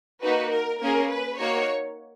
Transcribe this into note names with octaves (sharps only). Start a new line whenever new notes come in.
A#3 D#4 F#4 B4
A#4
A#3 C#4 G#4 A#4
B4
A#3 D#4 F#4 C#5